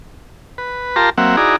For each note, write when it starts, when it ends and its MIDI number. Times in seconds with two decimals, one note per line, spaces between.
0.58 0.96 71
0.96 1.10 65
0.96 1.10 67
0.96 1.10 70
0.96 1.10 81
0.96 1.10 82
0.96 1.10 84
1.18 1.36 54
1.18 1.36 58
1.18 1.36 60
1.18 1.36 76
1.18 1.36 78
1.37 1.56 63
1.37 1.56 64
1.37 1.56 66
1.37 1.56 68
1.37 1.56 74
1.37 1.56 82